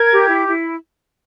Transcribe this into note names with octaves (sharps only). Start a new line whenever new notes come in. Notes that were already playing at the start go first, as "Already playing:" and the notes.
Already playing: A#4 G#6
G4
E4
E4